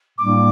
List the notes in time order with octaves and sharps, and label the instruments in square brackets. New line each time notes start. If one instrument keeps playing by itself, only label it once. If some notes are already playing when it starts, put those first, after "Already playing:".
[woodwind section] A2 G3 A#3 D4 [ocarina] D6